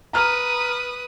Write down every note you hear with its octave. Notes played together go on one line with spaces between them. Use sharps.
B4 A#5 D#6 F6